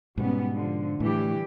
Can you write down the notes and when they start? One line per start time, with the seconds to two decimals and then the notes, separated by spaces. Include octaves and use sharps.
0.18 G#2 B2 G3 B3 C#4
0.54 D3 F3
1.00 A2 E3 G3 G4